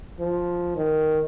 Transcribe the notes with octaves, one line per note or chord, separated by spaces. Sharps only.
F3
D#3